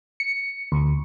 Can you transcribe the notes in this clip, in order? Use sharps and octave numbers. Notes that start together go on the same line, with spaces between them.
C#7
D2